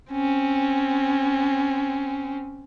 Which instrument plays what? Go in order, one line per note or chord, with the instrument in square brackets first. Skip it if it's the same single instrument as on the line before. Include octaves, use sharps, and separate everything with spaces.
[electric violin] C4 C#4